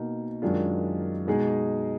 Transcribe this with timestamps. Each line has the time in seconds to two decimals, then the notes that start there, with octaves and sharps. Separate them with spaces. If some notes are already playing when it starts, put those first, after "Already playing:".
Already playing: B2 A#3 D#4
0.42 F#2 D#3 G#3 D4 F4
1.27 B2 G#3 D#4 G#4